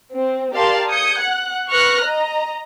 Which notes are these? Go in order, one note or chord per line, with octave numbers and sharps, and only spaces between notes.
C4
G4 A#4 D5 F5 A5 C6
D#6 G6 G#6 C#7
F#5 F#6
B4 C#6 F6 F#6 A#6
D#5 A#5